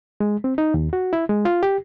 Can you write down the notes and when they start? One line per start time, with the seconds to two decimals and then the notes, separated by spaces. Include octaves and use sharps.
0.20 G#3
0.44 C4
0.58 D#4
0.74 D#2
0.93 F#4
1.13 E4
1.29 G#3
1.45 F4
1.63 G4